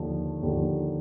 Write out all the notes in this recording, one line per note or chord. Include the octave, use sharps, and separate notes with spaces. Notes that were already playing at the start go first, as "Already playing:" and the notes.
Already playing: D#2 D3 F3
D#2 D3 F3